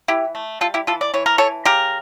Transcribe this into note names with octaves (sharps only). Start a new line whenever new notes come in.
E3 E4 G4
A3
G3 F4 A4
E4 G4
E3 F4 A4
D5
E3 C#5
A#4
E3 A4 C#5
C#3 G4 A#4